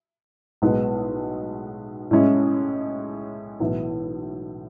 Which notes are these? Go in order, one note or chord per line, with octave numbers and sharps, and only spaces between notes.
B1 A2 G#3 B3
A2 G#3 C#4 E4
B1 A2 E3 B3 E4